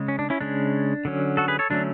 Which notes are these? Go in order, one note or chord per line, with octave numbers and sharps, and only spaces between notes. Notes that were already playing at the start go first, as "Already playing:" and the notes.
Already playing: C#3 G#3
C#4
D4
C#4 E4
C#3 G#3 C#4 D4
D3 F#3 C#4
F#4 A4
G#4 B4
A4 C#5
D3 F#3 A3 C#4 D4